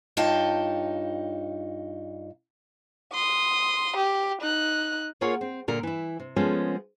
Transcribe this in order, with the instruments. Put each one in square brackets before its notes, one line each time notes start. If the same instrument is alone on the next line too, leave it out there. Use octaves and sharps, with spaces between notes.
[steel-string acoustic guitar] G2 D#4 F4 C#5 G5 A5
[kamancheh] C6 D#6
G4
D#4 F#6
[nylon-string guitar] A#3 F4 G#4 A#4 C#5 F#5
C4
A#2 D3 A#4
E3 E4
C3
F3 G#3 A3 B3 C#4